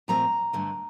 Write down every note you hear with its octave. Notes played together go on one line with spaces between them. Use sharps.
A#2 F3 A3 C4 A#5
G2 D3 A3